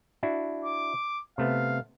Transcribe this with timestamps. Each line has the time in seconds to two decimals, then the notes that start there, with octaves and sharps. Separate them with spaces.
0.23 D4 E4 F#4
0.65 D6
1.38 C3 A3 B3 F5